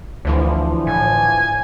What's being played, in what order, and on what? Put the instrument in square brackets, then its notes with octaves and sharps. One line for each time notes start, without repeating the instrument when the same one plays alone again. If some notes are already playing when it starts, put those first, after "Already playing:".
[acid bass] D2 [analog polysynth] D3 E3 F3
[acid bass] A2 [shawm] G#5